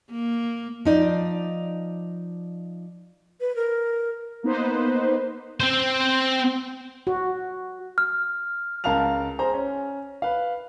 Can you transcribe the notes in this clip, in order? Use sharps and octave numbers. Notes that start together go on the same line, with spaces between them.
A#3
F3 D#4 D5
B4
A#4
A#3 B3 D#4 B4 C5
C4 C5
F#4
F6
C#2 A#4 F5 A5 F6 F7
G#4 C5 A#5
C#4
B4 F5